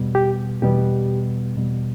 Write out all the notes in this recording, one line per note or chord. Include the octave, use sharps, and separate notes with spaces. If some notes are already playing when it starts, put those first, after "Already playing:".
Already playing: E2 B2 G3 B3
G4
E2 B2 G3 B3 G4
E2 B2 G3 B3